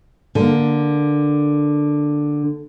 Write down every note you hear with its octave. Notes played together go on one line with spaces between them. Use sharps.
D3 A#3